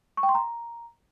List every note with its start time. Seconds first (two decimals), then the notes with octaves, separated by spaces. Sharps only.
0.17 C#6
0.23 G5
0.29 C6
0.35 A#5